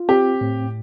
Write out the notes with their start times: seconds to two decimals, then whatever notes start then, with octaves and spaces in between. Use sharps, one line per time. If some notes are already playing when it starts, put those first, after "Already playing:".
Already playing: F4
0.09 C4 G4
0.41 A2